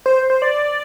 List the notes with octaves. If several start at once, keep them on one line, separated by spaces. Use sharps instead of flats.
C5
C5
D5